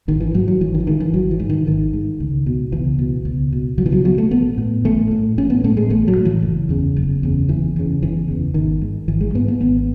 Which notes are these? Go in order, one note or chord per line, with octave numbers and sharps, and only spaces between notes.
G#1 D#3
E3
G#2 F#3
F#3
G#1 E3
D#3
E3
G#2 D#3
E3
G#1 F#3
E3
G#2
D#3
G#1 D#3
G#2
C#2
B2
C#2 E3
B2
C#2
B2
C#2 F#3
E3
F#3
B2 F#3
A3
A1 B3
A2
A1 A3
A2
A1 C#4
B3
A2 A3
G#3
A1 A3
F#3
A2
E3
F#1
E2 C#3
F#1
E2 C#3
F#1 E3
E2 C#3
F#1 E3
E2 C#3
G#1 D#3
G#2
G#1 E3
G#3
G#2 B3
B3
G#1 B3